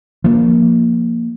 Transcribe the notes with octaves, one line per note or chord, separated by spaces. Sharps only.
F3 A#3